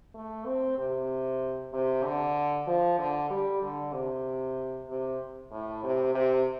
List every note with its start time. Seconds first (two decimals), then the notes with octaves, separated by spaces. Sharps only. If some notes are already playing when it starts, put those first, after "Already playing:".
0.15 A3
0.46 C4
0.78 C3
1.73 C3
2.04 D3
2.67 F3
2.99 D3
3.30 G3
3.62 D3
3.94 C3
4.89 C3
5.52 A2
5.84 C3
6.15 C3